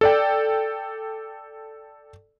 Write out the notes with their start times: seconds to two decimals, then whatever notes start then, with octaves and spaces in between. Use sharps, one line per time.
0.01 A4 D5 G5